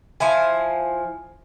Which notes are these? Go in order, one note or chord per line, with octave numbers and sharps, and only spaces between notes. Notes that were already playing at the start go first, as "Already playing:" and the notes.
F3 E4 G#5